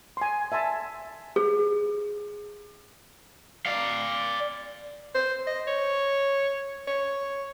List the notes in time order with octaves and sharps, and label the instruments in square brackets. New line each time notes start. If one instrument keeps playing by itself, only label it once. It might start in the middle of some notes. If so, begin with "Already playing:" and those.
[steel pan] G#5 C6
E5 G#5 A5 C6
[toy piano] G#4
[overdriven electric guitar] D5 F5
[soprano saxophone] C5
D#5
C#5
C#5